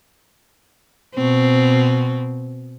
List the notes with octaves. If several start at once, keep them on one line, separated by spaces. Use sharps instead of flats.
B2 C4